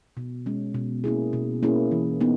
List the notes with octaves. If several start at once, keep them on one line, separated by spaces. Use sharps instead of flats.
B2
G#3 C#4
B2
A#3 C#4 E4 G#4
B2
A#3 C#4 E4 G#4
E3
B3 D#4